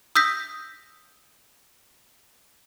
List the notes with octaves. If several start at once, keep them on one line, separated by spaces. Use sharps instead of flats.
D#6 E6 G6 A#6 B6